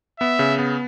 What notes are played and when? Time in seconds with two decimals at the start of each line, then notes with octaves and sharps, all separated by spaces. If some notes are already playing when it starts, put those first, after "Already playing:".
0.20 B3 E5
0.39 C#3
0.59 B3